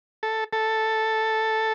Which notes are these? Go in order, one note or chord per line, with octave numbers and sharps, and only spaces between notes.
A4
A4